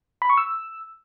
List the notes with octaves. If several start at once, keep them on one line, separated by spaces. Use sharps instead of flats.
B5
C#6
E6